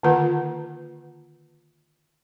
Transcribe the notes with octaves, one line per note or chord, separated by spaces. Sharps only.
D3 D#3 A#3 F4 B4 F#5